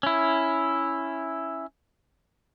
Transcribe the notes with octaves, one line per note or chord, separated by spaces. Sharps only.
C#4 E4